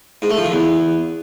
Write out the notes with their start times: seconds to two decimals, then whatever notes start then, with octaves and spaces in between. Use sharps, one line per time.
0.22 G#2
0.30 A3
0.37 F3
0.45 D3
0.52 E2